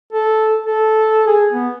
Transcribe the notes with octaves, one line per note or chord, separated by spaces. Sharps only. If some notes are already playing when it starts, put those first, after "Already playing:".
A4
A4
G#4
B3